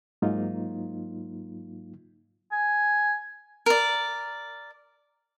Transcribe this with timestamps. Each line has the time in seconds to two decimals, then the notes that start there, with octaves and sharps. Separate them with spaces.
0.22 G#2 F#3 A#3 D#4 F4
2.52 G#5
3.66 A#4 D5